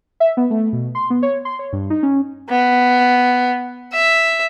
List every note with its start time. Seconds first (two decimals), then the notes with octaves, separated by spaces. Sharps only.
0.20 E5
0.37 B3
0.50 A3
0.73 B2
0.95 C6
1.10 B3
1.23 C#5
1.45 C6
1.59 C#5
1.73 G2
1.90 D#4
2.03 C#4
2.50 B3
3.93 E5